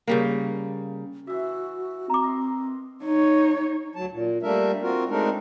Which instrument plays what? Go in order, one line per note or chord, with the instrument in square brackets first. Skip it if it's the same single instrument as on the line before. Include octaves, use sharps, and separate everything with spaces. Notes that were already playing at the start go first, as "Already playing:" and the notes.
[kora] C#3 G3 A#3
[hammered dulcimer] E3 E5 [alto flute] F#4
[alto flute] C4 [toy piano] A#5 D6
[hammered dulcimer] A#4 D#5 C6
[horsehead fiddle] D#4 C#5
[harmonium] D2 F#3 A5
A#2
G3 A3 A#3 D4 A#4 E5
C4 F4 F#4 A#4
G#3 A3 C4 D4 D#4 A#4